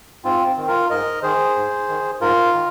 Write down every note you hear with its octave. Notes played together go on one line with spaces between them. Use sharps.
G#2 C4 F4
C4
D#3
F4 A#4
G#2 A#4 D#5
D#3 G#4 C5
G#2
D#3
G#2 F4 A#4
D#3